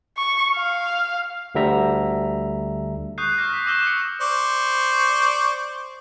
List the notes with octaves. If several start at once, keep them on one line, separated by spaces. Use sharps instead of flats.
C#6
F5
D2 D3 G3 E5 A#5
C#6 D#6 F#6 G6 C7
D6 F6 G6 A#6
A#6 B6
C#6 D6 E6 A#6 E7 G7
D#6 C#7
C5 D5 C#6